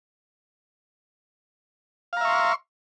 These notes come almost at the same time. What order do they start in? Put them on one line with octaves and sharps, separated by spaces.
F5 A#5 E5 C#6 C6